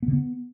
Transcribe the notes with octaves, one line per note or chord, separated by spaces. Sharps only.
B3
D3
B3